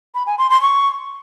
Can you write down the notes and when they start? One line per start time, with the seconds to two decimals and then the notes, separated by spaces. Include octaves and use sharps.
0.15 B5
0.26 G#5
0.38 C6
0.50 C6
0.62 C#6